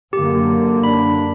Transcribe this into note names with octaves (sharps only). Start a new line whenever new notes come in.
F#2 D3 A#3 G4
D4 B5